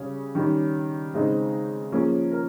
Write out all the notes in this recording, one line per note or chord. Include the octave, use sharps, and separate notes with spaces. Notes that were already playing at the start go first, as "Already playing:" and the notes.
Already playing: C#3 G3 C#4
D#3 G3 C#4
C#3 G#3 C4 D#4
F3 A#3 C#4 G#4
A#4